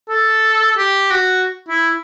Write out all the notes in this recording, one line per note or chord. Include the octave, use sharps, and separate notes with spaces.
A4
G4
F#4
E4